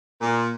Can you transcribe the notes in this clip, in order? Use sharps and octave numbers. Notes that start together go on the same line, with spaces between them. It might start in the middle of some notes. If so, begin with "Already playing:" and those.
A#2